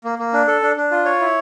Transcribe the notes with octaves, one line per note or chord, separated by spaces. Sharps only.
A#3
A#3
D4
A4
D4
D4
F4
C#5
E4